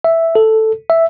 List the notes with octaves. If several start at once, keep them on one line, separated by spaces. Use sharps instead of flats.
E5
A4
E5